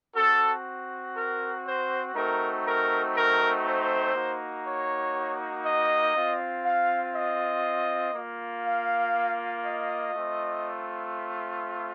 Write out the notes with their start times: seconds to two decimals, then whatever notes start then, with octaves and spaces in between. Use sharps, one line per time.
0.15 C4 F#4 A4
1.16 A#4
1.66 C5
2.15 A3 C4 D#4 F#4 A#4
2.65 A#4
3.15 A#4
3.65 C5
4.15 A#3 D#4 F#4
4.65 C#5
5.65 D#5
6.15 C4 F4
6.65 F5
7.15 D#5
8.14 A#3 F4
8.65 F5
9.64 D#5
10.14 A3 C4 F4